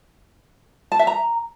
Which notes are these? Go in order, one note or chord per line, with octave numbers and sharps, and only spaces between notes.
A5
E5
A#5